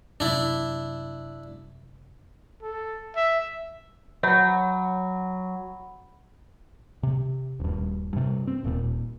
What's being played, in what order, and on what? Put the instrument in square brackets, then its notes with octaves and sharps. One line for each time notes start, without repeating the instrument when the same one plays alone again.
[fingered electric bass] F#2 C3 [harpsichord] D4 E4
[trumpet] A4
E5
[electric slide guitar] F#3 [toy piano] C#5 [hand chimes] F#5 B5
[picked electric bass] C3
D#1 G2
G2 C3
C4
D#1 A#2